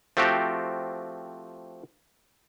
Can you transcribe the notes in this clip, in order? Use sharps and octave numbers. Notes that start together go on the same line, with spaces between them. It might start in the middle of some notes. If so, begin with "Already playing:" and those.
F3 A3 C4 F#4 G4